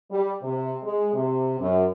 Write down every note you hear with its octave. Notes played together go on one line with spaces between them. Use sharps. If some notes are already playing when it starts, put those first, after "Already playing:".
G3
C3
G#3
C3
F#2